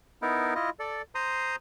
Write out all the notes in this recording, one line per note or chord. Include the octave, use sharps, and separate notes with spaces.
B3 D#4 E4 A#4
E4 F4 D#5
A4 D5
C5 A#5 C6 D#6